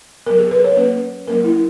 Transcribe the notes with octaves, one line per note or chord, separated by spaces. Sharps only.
F#3 B3 A#4
G#4
B4
C#5
F#3 A#3 C#4 B4
F#3 A#3 C#4 A#4
E4